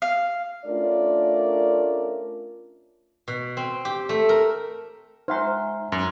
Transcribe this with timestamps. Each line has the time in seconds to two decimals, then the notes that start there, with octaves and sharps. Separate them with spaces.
0.02 F5
0.65 A3 C#4 D4 F4 A#4 D5
3.28 B2
3.57 C4
3.85 G4
4.09 A3
4.29 A#4
5.28 G#3 D#4 C5 E5 F#5 A#5 C6 F6
5.92 F#2